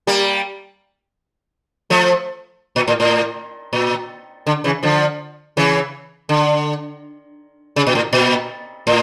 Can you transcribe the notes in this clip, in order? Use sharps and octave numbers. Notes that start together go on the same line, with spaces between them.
G3 A#3
F3 A3
A#2
A2
A2
A#2
D3
C#3 E3
D3 F3
C#3 E3
D3
C#3
A#2
A2
A#2
A2